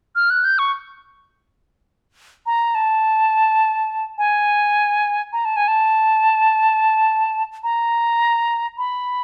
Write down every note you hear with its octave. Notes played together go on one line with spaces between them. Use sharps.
F6
F#6
G6
C#6
A#5
A5
G#5
A#5
A5
G#5
A5
A#5
B5